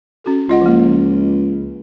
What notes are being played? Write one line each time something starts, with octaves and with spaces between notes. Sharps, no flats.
C#4 F#4 A4
C#2 F4 D#5 F#5
F3 A#3